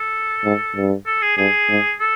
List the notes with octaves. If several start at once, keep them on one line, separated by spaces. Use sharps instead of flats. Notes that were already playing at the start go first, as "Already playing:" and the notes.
Already playing: A4
G#2
G2
A4
G#4
G2 G#4
G#2
A4